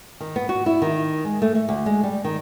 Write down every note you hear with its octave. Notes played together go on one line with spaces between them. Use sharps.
D#3
B3
F#4
E4
D#3
G#3
A3
A3
D2
G#3
G3
D#3